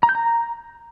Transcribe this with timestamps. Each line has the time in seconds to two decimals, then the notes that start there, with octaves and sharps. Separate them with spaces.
0.03 A#5
0.09 G6
0.15 A#5